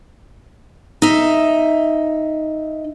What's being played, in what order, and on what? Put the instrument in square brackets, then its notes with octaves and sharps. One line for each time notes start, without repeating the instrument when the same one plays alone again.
[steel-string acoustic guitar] D#4 E5